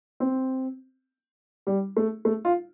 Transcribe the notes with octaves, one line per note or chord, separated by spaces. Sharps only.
C4
G3
A3
A3
F4